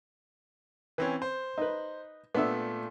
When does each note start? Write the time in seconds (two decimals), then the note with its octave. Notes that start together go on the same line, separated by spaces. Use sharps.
0.98 E3 C4 C#4 B4
1.22 C5
1.58 D#4 B4
2.34 A#2 A3 B3 D4 E5